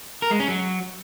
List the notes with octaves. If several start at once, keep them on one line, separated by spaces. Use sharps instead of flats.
A#4
G#3
C#4
F#3